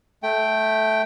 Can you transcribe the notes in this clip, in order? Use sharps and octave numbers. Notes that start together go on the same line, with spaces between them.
A3 G5